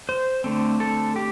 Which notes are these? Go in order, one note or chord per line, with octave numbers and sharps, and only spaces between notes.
C5
D3 A3 C4
A4
G4